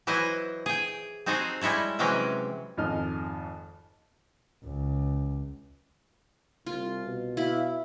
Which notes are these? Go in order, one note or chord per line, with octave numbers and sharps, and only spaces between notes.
E3 F#3 E4 C5 D#5
G#4 G5
C4 D#4 F#4 G#4 A4 C5
G3 G#3 E4 A4 C#5
C3 E3 F#3 G#3 C#4 G5
G#1 F2 G#2 D#5 F6
C#2
C2 F4
B2
E4 F#4 E5 F5 B5